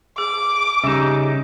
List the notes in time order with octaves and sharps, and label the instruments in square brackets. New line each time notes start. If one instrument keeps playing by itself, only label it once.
[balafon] G#4 [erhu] D6
[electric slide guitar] C#3 D#4 [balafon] G3 G4